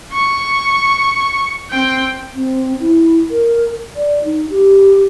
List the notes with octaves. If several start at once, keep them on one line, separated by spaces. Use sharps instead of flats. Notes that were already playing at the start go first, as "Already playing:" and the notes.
C#6
C4 G5
C4
E4
A#4
D5
D#4
G4